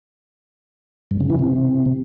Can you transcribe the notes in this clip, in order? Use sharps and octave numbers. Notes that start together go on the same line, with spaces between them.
G2
C#3
E3
C3